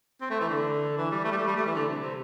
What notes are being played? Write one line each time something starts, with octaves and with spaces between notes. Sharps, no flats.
C4
A3
E3
D3
E3
G3
A3
G3
A3
G3
A3
E3
D3
C3
C3